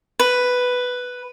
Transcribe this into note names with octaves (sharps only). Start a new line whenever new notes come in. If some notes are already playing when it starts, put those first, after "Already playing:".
B4